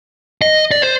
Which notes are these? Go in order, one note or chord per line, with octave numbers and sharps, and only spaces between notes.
D#5
D5
C5